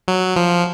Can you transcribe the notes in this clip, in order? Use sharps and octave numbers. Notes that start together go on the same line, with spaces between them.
F#3
F3